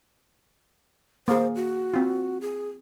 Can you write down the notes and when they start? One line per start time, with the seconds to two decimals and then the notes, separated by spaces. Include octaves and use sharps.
1.28 A#3 G#4 C5
1.55 F#4
1.94 C4 F4
2.41 G#4